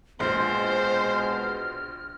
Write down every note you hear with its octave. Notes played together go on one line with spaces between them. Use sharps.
A#1 B2 G#3 B3 C5 C6 F6